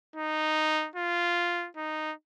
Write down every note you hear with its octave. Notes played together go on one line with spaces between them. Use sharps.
D#4
F4
D#4